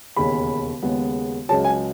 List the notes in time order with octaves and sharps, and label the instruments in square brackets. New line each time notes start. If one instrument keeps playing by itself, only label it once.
[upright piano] E1 D#2 C#3 B5
D#2 C#3 G#3 B3
C#2 C#3 F#3 C#4 A5
G#5